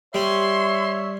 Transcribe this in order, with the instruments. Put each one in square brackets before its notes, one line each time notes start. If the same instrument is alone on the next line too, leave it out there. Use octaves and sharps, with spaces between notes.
[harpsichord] G3 [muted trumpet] C#5 [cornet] E5 [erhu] C6